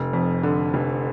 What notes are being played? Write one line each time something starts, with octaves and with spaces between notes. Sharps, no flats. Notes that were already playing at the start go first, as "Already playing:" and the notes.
Already playing: F1
F2
D3
F1